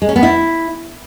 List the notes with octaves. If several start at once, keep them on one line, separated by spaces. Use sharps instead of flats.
G#3
C#4
B3
E4